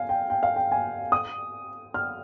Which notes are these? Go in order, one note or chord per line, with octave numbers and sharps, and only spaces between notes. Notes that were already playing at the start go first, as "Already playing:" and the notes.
Already playing: F5 G#5
G5
G5
F5
G5
G#5
D#6
F6